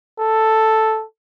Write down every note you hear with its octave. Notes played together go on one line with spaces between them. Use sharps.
A4